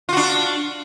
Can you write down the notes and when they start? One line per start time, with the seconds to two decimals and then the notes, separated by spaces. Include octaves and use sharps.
0.09 F4
0.13 F#4
0.17 D4